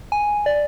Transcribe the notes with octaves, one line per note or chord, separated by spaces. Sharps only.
G#5
D5